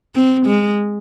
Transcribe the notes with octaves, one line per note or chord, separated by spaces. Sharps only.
C4
G#3